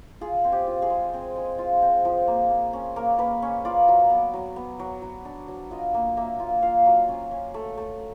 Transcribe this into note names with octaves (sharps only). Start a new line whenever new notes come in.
F4 G#4
C4
G4
F4
G#4
G#3
C4
G#3
F4
C4
F3
A#3
A#3
C#4
A#3 A#4
A#3 B4
C#4
F4 D5
F#3
B3
F#3
B3
F#3
F#3
D4
F#3
F4 D#5
A#3
A#3 E5
F4
F4 F5
F#3
C#4
C#4
A3
A3